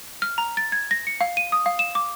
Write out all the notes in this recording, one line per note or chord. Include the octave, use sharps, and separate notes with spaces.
F6
A#5
A6
G#6
A#6
C#7
F5
D#7
D#6
F5
E7
D6